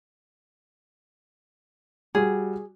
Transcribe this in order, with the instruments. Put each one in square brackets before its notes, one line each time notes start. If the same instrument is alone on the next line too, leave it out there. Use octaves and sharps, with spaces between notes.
[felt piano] G3 F#4 [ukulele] G#4